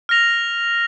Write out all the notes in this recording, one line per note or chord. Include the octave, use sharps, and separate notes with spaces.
F6 A#6 F7